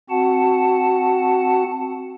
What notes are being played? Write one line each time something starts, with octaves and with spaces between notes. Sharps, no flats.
C4 F#4 F#5 A5